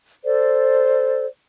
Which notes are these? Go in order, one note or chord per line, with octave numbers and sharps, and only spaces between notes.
A4 C5 D5